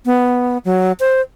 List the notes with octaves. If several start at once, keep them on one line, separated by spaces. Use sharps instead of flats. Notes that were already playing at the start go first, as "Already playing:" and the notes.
B3
F#3
C5